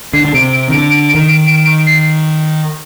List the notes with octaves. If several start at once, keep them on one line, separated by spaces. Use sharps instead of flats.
D3 C7
D3
C3 D7
D7
D3 D#3 D7
D7
D7
D#3
D7
D7
D7
C7